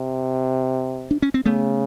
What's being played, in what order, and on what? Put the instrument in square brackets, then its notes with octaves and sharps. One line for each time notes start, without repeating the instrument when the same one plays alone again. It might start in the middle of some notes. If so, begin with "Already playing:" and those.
Already playing: [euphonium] C3
[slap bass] D4
C#4
C4
[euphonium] C#3 [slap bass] A3 B3